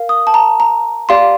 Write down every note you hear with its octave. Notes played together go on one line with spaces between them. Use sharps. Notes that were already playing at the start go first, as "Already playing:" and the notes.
Already playing: A#4 F5
D#6
A5
A#5
A#5
G4 D5 F5 C6